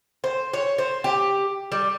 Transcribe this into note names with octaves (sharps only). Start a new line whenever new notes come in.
C5
C#5
C5
G4
G3